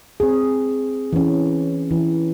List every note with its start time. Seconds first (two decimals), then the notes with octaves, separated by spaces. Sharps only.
0.20 C4 G#4
1.13 E3 C#4
1.91 E3